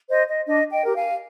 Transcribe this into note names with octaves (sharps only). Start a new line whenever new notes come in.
C5 D#5
D#5
D4 D#5
D#5 G5
G4 A#4
F5 G#5